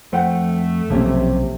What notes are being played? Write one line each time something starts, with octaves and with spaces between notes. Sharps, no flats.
F2 A3 C5 F#5 G5
B1 C3 F3 A#3 C#4